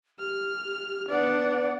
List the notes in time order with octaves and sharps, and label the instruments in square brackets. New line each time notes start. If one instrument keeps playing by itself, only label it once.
[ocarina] G4 [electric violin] F6
[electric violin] B3 D4 [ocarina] B4 [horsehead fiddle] D5 F#5